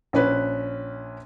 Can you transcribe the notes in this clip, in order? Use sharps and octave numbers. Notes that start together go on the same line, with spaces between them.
A#1 C#4 B4